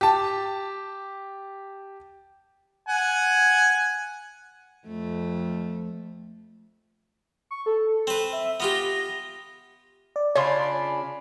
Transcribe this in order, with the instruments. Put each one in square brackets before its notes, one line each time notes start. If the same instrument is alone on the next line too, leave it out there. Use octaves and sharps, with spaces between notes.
[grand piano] G4 A5
[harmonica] F#5 G#5
[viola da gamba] F2 A3
[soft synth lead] C#6
A4
[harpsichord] C4 B4
[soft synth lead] E5
[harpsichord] B3 F4 G4 [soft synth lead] A#6
[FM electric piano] D5
[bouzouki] C#3 D4 F4 [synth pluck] C#5 C6 [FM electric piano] G#5 B5